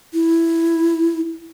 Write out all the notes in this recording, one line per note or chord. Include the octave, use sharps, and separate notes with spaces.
E4